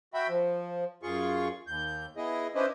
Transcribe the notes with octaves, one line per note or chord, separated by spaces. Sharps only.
F#4 E5 G5 B5
F3
F#2 F4 G#4 C#6
D#2 G6
B3 E4 G#4 D#5
C#4 D4 E4 B4 C5 D#5